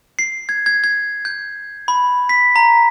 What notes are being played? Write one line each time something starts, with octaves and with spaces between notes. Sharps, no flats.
C7
G#6
G#6
G#6
G6
B5
B6
A#5